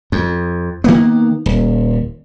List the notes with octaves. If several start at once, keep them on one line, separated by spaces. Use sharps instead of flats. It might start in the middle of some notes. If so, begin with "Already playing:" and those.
F2
D#3 A#3 B3
D#1